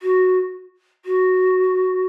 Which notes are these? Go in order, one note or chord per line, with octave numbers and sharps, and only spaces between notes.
F#4
F#4